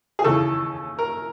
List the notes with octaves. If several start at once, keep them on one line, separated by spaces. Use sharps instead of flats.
G#4
D#2 C#3 E3 A4
A#4